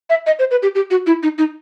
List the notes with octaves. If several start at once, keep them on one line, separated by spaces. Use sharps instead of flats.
E5
D#5
C5
B4
G4
G4
F#4
E4
D#4
D#4